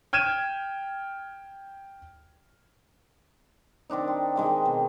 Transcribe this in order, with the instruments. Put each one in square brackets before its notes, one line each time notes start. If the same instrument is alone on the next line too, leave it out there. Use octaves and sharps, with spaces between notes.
[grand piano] G5 F6 G#6 D#7 E7
[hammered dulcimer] D#3 C4 D4 D#4
C6
D#3 G#3 G5
B2